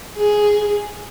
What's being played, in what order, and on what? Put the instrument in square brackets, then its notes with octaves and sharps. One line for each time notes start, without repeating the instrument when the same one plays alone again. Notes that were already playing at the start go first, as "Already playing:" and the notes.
[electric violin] G#4